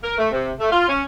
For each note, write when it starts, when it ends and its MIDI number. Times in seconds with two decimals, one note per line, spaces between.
0.02 0.15 70
0.18 0.29 57
0.31 0.51 48
0.59 0.69 57
0.71 0.86 65
0.88 1.03 61